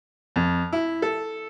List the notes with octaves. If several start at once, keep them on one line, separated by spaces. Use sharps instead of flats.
F2
E4
A4